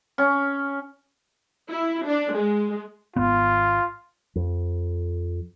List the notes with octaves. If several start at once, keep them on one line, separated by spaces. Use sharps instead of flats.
C#4
E4
D4
G#3
G#1 B3 F4
F2